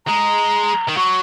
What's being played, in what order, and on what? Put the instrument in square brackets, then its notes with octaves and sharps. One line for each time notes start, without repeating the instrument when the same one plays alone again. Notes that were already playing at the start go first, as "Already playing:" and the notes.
[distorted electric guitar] G#3 [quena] A#5
[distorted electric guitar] D#3
[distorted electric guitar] F#3 [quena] C#6